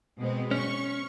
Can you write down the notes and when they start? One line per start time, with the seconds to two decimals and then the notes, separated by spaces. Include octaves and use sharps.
0.19 B2 G#3 C4
0.51 C#4 C#6